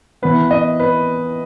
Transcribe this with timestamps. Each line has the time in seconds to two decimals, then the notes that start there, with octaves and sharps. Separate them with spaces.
0.22 E3 B3 B4
0.51 D#5
0.80 B4